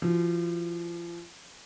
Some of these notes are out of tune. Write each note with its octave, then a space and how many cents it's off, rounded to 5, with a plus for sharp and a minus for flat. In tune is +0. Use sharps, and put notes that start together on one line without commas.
F3 -35 F#4 -30